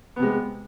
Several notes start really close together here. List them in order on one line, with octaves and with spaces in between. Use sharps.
B3 C3 G#3